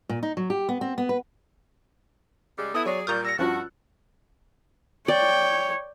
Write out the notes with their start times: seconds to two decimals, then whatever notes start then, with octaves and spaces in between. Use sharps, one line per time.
0.09 A#2
0.23 D#4
0.37 F#3
0.50 G4
0.69 B3
0.81 C4
0.98 B3
1.09 B4
2.57 C#3 G3 G#3
2.74 B3 E4 A4 D#6
2.86 F#3 G#4 C#5 D5
3.07 A#2 G3 A#5 C#6 D#6 F6 G6 A6
3.25 E6 A#6 C#7
3.39 G2 F3 C#4 F4 F#4 A5 C#6 F#6
5.08 C#5 D5 G5